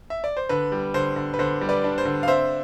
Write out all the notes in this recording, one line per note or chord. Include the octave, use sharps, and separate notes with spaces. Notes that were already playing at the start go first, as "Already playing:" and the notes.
E5
D5
C5
D3 B4
G3
D3 C5
D3
B4
D3 C5
G3
B4 D5
D4
C5
D3
F5
C4 C5 E5